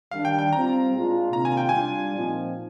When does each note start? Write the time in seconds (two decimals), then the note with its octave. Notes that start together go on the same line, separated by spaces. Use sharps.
0.11 D#3 G3 D4 F5
0.25 G5
0.39 G5
0.52 G3 C4 F4 A#5
0.93 A#2 G#3 D4 F4
1.33 C3 D#3 A#3 D4 F4 A#5
1.45 G#5
1.57 G5
1.69 G3 D4 F4 G#5
2.14 A#2 F3 C4 D#4